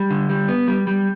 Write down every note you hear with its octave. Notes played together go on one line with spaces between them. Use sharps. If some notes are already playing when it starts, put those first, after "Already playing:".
Already playing: G3
D3
G3
B3
G3
G3